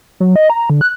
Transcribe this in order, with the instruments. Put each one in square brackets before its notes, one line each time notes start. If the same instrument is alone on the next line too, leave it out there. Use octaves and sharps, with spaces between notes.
[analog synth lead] F#3
D#5
A#5
D3
F#6